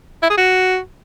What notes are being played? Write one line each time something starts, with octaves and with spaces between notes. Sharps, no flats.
E4
G#4
F#4